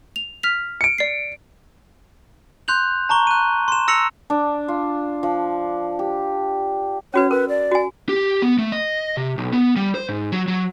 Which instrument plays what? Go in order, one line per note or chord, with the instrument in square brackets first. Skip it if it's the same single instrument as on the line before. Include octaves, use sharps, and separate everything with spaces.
[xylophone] F7
F6 B6 F7
[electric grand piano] C#7 D7
[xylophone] D5 C7
[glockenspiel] C6 F#6 G6 F7 F#7
A5 A#5 C#6 G7
F#6 D#7
C6 E7
E6 A#6 C#7 F7 F#7
[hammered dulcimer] D4
F4
F3
G4
[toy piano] C#4 F#4 B4 [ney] C#5
[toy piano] A#4 [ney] B4
[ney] D5
[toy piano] F#4 G#5
[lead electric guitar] G4
B3
A3
D#5
C3
B1
B3
G3
C5
G#2
F#3
F#3